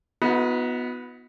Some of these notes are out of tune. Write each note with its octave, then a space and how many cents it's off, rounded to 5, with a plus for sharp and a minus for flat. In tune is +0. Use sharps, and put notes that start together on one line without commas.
B3 +0 D#4 +30 F#4 -40